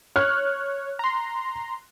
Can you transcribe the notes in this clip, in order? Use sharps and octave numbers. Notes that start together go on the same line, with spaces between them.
C#5 F6 F#6
A#5 C6